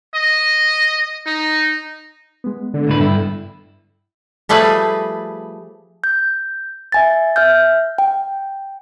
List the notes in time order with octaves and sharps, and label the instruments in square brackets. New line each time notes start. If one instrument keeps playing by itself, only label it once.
[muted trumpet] D#5
D#4
[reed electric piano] G#3 B3
[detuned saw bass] D3
[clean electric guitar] C#2 A2 B4
G2 E4
[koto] F3 G3 A3 G#4 B4
[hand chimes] G6
E5 G#5 A6
E5 F6 G6
G5